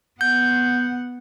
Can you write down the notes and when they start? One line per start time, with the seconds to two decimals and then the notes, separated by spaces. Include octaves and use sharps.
0.21 B3 F#5 G6